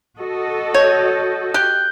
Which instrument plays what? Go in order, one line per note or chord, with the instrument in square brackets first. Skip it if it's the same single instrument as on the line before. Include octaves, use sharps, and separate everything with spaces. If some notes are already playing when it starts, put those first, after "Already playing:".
[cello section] F#4 A4 D#5
[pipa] C#5 [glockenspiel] G6
[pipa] G4 [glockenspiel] F#6 G6 G7